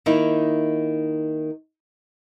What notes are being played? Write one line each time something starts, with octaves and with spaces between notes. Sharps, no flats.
D#3 A#3 D#4 E4